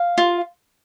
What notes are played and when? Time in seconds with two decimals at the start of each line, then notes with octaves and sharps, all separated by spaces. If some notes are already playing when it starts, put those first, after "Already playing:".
Already playing: F5
0.18 F4